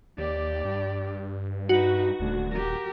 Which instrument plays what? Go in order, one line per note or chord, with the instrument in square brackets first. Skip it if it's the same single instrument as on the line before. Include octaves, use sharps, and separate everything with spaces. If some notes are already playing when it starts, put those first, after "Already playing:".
[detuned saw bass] D#2 [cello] G4 D5
[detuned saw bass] G2
[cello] D#4 B4 [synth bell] F#4
[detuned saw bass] D#1 [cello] D2
[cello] G4 A#4